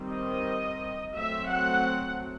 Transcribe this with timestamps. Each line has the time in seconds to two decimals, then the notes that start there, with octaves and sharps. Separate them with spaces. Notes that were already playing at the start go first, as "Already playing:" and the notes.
Already playing: D#3 G3 C4
0.11 D#5
1.15 F#3 A3 C4 E5
1.49 F#5